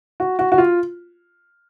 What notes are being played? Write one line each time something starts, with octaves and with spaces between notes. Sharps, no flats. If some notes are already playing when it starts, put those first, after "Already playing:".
F#4
F#4
F#4
F4